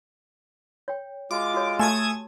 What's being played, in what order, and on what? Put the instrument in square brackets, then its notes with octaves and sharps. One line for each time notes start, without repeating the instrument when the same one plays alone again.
[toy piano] C#5 G5
[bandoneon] G#3 F4 [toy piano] F#4 [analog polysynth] D6
[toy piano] F#4 A4 C#5
[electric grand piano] A3 A4 G#5 [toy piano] G4 A5 [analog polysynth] D#6 G#6 E7